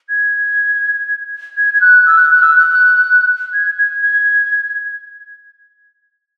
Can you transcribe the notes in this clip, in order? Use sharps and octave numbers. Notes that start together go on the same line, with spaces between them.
G#6
G#6
G#6
F#6
E6
F#6
F#6
E6
F#6
G#6
G#6
G#6